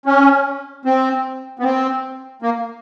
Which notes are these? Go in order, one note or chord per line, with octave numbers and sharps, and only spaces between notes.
C#4
C4
B3
C4
A#3